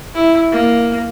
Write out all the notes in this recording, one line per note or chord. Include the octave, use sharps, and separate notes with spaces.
E4
A#3